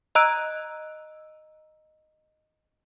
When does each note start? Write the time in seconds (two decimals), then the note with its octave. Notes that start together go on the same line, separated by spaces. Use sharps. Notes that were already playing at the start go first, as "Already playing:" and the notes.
0.15 D#5 A#5 E6 F#6 D7